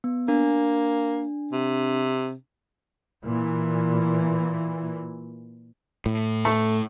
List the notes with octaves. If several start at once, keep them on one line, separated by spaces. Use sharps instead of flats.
B3
A#3 D4
C3
A#2 E3
A2
A3